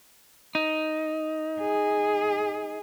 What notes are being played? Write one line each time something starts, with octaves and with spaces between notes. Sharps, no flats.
D#4
G#4